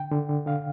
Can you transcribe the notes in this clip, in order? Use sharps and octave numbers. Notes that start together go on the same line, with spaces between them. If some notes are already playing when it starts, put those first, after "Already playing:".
Already playing: D3 G5
D3
D3
D3 F5